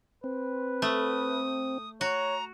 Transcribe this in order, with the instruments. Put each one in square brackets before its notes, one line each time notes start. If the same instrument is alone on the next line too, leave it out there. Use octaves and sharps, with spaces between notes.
[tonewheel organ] C4 [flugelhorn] B4
[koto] A3 [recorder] D#6
[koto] F#4 [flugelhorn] C#5 [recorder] A#5